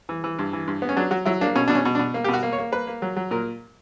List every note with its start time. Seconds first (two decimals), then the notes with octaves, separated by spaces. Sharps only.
0.09 E3
0.24 E3
0.39 G2
0.53 E3
0.67 G2
0.82 B3
0.89 C#4
0.96 F#3 D4
1.11 F#3 F#4
1.25 F#3 E4
1.41 A#3 D4
1.55 B2 C#4
1.68 B2 D4
1.75 C#4
1.85 B2
1.95 D4
1.99 B2
2.14 A#3
2.24 B2 G4
2.33 F#4
2.43 A#3
2.53 C#5
2.58 A#3
2.72 A#3 B4
2.87 A#3
3.02 F#3
3.17 F#3
3.31 A#2 A#4